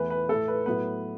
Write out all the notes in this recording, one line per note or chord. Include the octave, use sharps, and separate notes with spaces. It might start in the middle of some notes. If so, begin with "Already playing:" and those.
Already playing: E2 E3 A3 B4
B4
A2 A3 A4
B4
A2 F#3 B3 B4